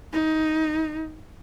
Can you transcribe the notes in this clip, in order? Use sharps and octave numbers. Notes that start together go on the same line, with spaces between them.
D#4